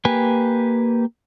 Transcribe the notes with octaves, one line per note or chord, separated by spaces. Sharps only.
A#3 G4 B4 G#5